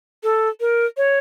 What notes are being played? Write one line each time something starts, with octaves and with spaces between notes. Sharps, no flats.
A4
A#4
C#5